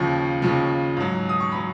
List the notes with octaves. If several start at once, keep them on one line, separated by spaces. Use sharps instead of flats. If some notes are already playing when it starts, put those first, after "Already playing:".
Already playing: D#2 C#3 F3 C#6
D#2 C#3 F3
G#2 F#3
D#6
C#6
F#3 B5